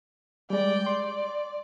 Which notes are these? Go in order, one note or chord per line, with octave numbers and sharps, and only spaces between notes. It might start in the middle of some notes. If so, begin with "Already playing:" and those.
G3 G#3 D5 G5
D5 C6